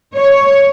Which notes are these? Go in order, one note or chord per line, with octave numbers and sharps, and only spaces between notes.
C#5